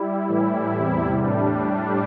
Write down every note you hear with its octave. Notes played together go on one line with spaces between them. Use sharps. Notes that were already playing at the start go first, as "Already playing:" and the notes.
Already playing: G3 E4
A2 E3 G3
E2 C3 G3
A2 G3 D4
A2 G3